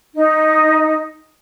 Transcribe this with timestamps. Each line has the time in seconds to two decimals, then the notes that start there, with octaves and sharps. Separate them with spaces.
0.15 D#4